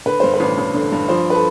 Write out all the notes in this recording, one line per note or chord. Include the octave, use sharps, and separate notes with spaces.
D3 B4
G2 C5
B4
A1
A1
D3
G2
F3 C5
B4
A4